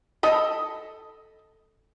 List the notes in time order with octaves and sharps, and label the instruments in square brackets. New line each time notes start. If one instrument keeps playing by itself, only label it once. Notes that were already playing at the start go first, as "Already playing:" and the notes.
[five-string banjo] A4 D#5 B5